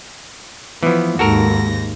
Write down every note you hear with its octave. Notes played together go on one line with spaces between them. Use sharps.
E3 F3 B3
D#2 G#2 F#4 A4 A#4 A#6